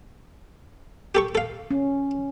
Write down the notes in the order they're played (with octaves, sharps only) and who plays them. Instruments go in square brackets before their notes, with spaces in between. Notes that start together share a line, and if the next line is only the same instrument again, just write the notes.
[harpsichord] G4 A4 C#6
A4 F5
[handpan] C#4